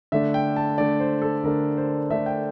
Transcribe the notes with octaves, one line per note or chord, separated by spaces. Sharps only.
D3 A3 D4 E5
G5
A5
D3 A3 D4 D5
C5
A4
D3 A3 D4 A#4
C5
D3 A3 D4 E5
G5